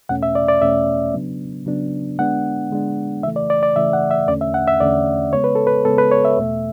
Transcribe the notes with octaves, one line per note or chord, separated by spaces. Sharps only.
E2 B2 A3 C#4 F#5
E5
D5
D5
E2 B2 A3 C#4 E5
C#3 F#3 B3 D4
C#3 F#3 B3 D4
D3 G#3 B3 D4 F#5
D3 G#3 B3 D4
C#3 E3 A3 E5
D5
D5
D5
C#3 E3 A3 E5
F#5
E5
E2 D3 A3 C#4 D5
E5
F#5
E5
E2 D3 A3 C#4 D5
C#3 G#3 B3 C#5
B4
A4
B4
C#3 G#3 B3 A4
B4
C#5
E5
E2 B2 A3